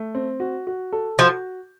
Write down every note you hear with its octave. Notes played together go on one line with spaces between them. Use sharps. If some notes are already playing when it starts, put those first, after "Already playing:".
Already playing: A3
C4
F#4
F#4
A4
F3 F#4